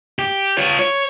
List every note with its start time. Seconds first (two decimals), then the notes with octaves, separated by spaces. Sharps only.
0.19 G4
0.58 F4 C#5
0.79 C#5